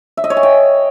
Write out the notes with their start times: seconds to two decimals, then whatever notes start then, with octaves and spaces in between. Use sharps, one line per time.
0.17 E5
0.24 D#5
0.30 C#5
0.37 G#5
0.43 G5